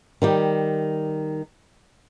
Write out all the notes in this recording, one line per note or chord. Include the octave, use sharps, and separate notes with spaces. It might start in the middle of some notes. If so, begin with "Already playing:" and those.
D#3 G3 G4